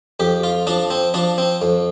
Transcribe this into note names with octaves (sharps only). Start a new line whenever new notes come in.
F2 G4
F4
F3 D4
C4
F3 D4
C4
F2